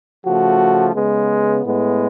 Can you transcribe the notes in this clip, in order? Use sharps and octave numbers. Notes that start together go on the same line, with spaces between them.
C#3 F3 A3 F#4
C#3 G#3 B3
A2 G#3 B3